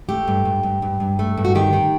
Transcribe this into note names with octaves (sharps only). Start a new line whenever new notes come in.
A3 G4
G2
G2
G2
G2
G2
A3
G2
F#4
D#3 G4
D#3